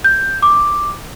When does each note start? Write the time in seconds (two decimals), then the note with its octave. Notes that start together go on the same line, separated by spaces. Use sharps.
0.04 G6
0.42 D6